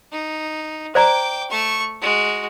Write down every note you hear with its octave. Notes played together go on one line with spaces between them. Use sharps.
D#4
C5 D5 G5 A#5 D6
A3 C#6
G#3 F#4